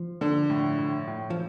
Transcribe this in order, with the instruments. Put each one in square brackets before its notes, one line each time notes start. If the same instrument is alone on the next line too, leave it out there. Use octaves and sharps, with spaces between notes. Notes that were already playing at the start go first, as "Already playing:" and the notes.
Already playing: [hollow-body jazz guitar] F3
[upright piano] D3
A2
A2
A2
[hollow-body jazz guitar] F3